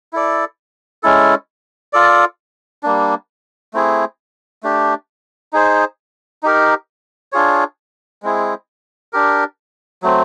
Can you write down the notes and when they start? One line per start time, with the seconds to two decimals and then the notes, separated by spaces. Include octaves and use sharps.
0.13 E4 A4 D5
1.03 G#3 C#4 E4 A4
1.93 F4 A4 D5
2.83 G3 A#3 D4
3.73 A3 C4 E4 G#4
4.63 A3 D4 G4
5.53 D#4 G#4 C5
6.43 D#4 G4 A#4
7.32 D4 F4 G#4 C#5
8.22 G#3 C4 E4 G#4
9.13 D4 G4 A#4
10.02 F#3 A3 C4